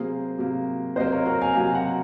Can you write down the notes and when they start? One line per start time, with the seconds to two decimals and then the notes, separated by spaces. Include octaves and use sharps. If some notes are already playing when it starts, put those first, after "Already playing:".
Already playing: C3 F#3 A#3 G#4 C5
0.38 C3 F#3 A#3
0.96 C3 F#3 A#3 C5 D#5
1.12 A#4 C#5
1.26 F#4 A#4
1.41 F5 G#5
1.55 C3 F#3 A#3 F5 G#5
1.75 F#5 A#5